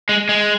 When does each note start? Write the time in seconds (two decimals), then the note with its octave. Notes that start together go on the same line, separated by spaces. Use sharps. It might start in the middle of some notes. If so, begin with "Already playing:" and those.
0.09 G#3
0.29 G#3